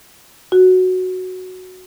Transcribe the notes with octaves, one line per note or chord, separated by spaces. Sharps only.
F#4